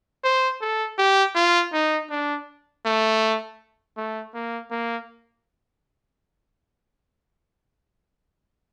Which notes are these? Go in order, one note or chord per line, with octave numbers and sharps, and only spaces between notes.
C5
A4
G4
F4
D#4
D4
A3
A3
A#3
A#3